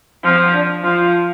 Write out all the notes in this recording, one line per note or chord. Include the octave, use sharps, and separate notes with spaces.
F3 C4
D4
F3 F4